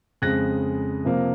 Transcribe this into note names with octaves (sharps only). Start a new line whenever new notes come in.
F2 C#3 G#3 F#6 A#6
C3 F3 A#3